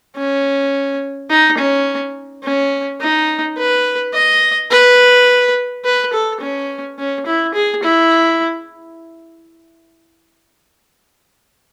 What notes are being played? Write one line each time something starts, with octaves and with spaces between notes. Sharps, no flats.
C#4
D#4
C#4
C#4
D#4
B4
D#5
B4
B4
A4
C#4
C#4
E4
G#4
E4